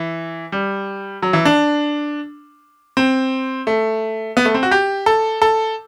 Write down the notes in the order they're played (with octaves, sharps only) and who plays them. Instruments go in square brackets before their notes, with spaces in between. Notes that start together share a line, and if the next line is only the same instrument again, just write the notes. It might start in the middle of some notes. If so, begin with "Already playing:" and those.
Already playing: [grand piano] E3
G3
F#3
E3
D4
C4
A3
B3
A3
C4
F#4
G4
A4
A4